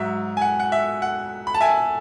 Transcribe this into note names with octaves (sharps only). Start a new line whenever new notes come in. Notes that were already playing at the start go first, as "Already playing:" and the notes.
Already playing: G#2 F#3 E5
G#5
F#5
F#5
E5
F#5
B5
A5
E5 G#5